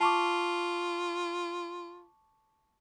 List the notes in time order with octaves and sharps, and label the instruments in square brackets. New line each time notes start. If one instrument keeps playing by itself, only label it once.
[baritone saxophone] F4 [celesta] A5 C#6 D6